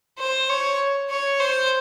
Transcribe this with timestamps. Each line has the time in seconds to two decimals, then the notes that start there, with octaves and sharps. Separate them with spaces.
0.19 C5
0.49 C#5
1.10 C#5
1.40 C5